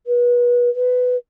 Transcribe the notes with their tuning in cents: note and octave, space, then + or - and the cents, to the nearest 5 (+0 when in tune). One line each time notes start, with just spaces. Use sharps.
B4 -30
B4 +15